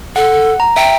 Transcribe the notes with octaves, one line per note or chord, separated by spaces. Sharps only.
A4 F#5
A#5
E5 G5